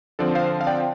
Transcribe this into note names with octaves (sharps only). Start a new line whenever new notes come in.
D3 F3 C4 A4 D5
C5 F5
F5
D5 G5